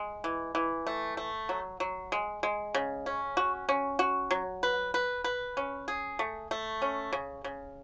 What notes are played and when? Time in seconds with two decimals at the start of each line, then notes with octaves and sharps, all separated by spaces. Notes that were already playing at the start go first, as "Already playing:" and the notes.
Already playing: G#3
0.24 E3
0.55 E3
0.87 A3
1.17 A3
1.49 F#3
1.80 F#3
2.12 G#3
2.43 G#3
2.75 C#3
3.06 C#4
3.37 F#4
3.69 C#4
3.99 F#4
4.31 F#3
4.63 B4
4.94 B4
5.24 B4
5.57 C#4
5.88 G#4
6.19 A3
6.51 A3
6.82 C#4
7.13 C#3
7.44 C#3